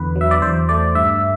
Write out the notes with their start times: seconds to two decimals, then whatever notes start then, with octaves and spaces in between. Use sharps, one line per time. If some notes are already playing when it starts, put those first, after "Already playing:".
Already playing: E2 D3 B3 B4
0.16 F#3
0.21 E5
0.31 D5
0.42 E2 C5
0.69 A3 D5
0.95 G2 E5